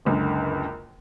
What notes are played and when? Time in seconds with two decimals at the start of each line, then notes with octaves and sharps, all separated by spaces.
0.05 F#1 C#2 F#2 D3